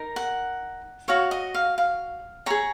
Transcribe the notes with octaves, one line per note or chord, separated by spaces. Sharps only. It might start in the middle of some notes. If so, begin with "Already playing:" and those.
Already playing: D#4 A#4
F#5
F#4 C#5 F5
D#5
F5
F5
G#4 C#5 A#5